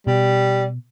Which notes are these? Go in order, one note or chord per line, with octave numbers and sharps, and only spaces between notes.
B2 G3